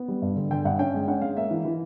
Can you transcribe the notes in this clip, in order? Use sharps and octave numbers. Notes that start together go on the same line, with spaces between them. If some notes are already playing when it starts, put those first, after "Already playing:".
Already playing: B3
G3
G2
D3
D3 G5
G2 F#5
C#4 G5
G#3
C#4 F#5
G#3 F5
A#3 E5
E3
E3